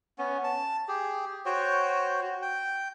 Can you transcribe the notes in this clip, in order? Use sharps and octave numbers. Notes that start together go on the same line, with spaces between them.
B3 C#4
A5
G4 G#4
F#4 C5 C#5 G5
F#4
G5